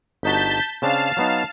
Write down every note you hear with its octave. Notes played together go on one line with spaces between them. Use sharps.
G1 D#4 F#4 A5 G6 B6
C#3 C4 D4 F5 A5
F#3 B3 D#4